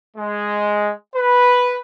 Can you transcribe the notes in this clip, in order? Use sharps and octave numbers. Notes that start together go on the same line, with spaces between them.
G#3
B4